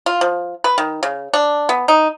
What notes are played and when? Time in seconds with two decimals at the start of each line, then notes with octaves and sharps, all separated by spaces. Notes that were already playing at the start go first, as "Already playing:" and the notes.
0.06 F4
0.21 F3
0.64 B4
0.78 D#3
1.03 C#3
1.34 D4
1.69 B3
1.88 D#4